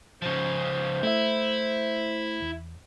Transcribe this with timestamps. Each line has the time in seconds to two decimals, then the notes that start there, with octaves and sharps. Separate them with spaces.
0.22 C#3 F3 C5
1.03 A3 E4 E5
2.42 E2